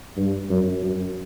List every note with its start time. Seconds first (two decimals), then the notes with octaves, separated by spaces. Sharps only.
0.17 G2
0.50 F#2
0.83 F#2